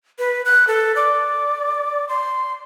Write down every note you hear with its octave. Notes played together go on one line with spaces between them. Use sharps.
B4
F#6
A4
D5
C6